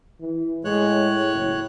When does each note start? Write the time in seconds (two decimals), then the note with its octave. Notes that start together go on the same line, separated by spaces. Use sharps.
0.21 E3
0.65 A2 G#3 C#5 F#6
1.32 F#1